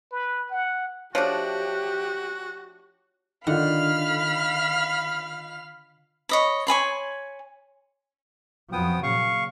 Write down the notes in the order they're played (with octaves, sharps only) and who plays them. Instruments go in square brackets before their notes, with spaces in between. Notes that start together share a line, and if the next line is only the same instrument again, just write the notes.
[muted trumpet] B4
F#5
[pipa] F3 A3 D4 [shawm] F#4 [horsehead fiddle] G4 [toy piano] C#5
[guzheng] D3 [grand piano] D#3 F4 [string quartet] F5 B5 F6
[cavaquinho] C#5 D#5 B5
C#5 G#5 B5 C6
[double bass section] F2 F3 F#3 [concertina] B3 G5 D#6
[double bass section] A#2 C#3 [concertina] F5 C#6